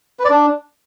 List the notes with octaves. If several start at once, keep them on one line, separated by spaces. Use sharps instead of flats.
B4
D5
D4